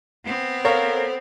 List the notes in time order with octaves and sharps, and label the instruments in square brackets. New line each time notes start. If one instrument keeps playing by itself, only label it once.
[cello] B3 C4
[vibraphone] A4 C5 [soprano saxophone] A#4 [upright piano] C#5 F5